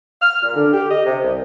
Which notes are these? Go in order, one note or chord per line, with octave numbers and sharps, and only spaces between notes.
F6
A#2
D3
G4
D#5
C3
C2